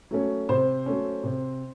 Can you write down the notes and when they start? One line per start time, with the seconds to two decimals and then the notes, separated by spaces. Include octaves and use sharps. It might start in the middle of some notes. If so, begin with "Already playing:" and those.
0.11 F#3 A3 C#4
0.49 C3 C5
0.86 F#3 A3 C#4
1.24 C3